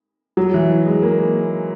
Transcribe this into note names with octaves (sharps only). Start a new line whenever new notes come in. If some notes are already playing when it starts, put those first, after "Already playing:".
F#3
E3
G#3
A#3